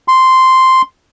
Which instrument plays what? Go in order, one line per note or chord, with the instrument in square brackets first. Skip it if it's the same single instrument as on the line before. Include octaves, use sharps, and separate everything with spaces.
[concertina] C6